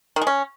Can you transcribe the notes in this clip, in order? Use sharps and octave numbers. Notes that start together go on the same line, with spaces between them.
D#3
G#3
C#4